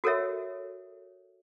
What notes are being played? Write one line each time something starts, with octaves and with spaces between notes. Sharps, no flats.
F#4 A4 A#4 C#5 E5